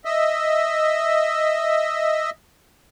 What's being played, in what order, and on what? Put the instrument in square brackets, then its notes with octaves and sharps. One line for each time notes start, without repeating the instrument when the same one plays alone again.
[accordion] D#5 E5